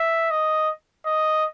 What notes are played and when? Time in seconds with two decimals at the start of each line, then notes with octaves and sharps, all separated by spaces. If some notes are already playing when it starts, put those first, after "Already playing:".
Already playing: E5
0.31 D#5
1.06 D#5